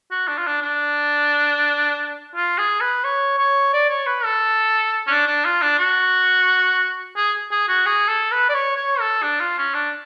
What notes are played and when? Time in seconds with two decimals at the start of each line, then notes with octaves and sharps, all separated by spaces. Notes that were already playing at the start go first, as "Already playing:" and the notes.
0.11 F#4
0.28 D4
0.38 F4
0.47 D4
0.62 D4
2.36 F4
2.58 G#4
2.81 B4
3.04 C#5
3.39 C#5
3.73 D5
3.90 C#5
4.06 B4
4.24 A4
5.07 C#4
5.10 D4
5.27 D4
5.45 F4
5.62 D4
5.79 F#4
7.17 G#4
7.51 G#4
7.68 F#4
7.86 G#4
8.09 A4
8.32 B4
8.49 D5
8.54 C#5
8.77 C#5
9.00 A4
9.23 D4
9.40 F4
9.58 C#4
9.74 D4